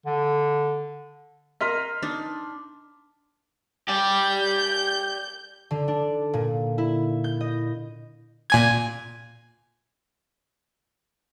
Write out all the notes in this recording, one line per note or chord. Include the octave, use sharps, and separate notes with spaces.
D3
A#4 D#5 C6 F6 B6
D4 D#4
G4 D5 G6
D3
D4
A#2
E4
G6
D#5
A#2 G#5 G#6